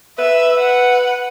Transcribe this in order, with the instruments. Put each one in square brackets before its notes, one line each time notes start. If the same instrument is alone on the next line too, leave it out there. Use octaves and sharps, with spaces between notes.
[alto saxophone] B4 [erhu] E5
[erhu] F#5